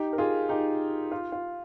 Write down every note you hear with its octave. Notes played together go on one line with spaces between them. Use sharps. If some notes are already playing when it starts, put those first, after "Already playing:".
Already playing: D#4 G4
A#4
F4 G#4
D#4 G4
F4
F4